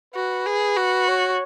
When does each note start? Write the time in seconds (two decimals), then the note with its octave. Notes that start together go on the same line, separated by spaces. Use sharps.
0.14 F#4 B4
0.46 G#4
0.76 F#4
1.08 C#5